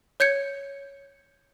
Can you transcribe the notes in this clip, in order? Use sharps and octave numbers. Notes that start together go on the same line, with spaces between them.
C#5 G6 G#6 C#7